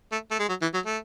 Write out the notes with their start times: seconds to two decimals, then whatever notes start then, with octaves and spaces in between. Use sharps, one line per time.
0.12 A3
0.31 A3
0.39 G#3
0.49 F#3
0.62 E3
0.74 F#3
0.86 A3